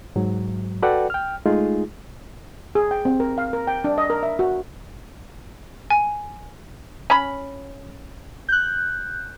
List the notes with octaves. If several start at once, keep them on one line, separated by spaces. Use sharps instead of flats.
G#2 F#3
F#4 A4 B4 D5 F#5 G5
G5 F6
G#3 A3 D#4 F4 G#4
G#4
G5
C4
A#4
F5
A#4
G5
D4
D#5
A#4
E5
F#4
G#5
C#4 B5
F#6 G6